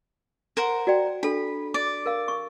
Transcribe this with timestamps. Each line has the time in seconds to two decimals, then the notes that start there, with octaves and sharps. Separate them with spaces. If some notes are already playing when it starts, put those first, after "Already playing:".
0.57 A#4 C5 F#5
0.87 F#4 D5 G5
1.23 D4 A4 B5
1.74 D5
2.06 A#4 F5
2.28 C#6